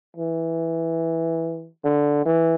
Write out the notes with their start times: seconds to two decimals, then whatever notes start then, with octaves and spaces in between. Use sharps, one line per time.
0.17 E3
1.84 D3
2.26 E3